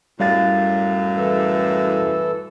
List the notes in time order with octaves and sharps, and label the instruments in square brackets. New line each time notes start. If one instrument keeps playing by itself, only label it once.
[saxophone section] F#2 A2 [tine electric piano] G3 F5 A6
[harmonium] E3 A4